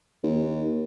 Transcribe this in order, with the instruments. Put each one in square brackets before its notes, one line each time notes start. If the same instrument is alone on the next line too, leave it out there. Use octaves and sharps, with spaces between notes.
[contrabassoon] D#2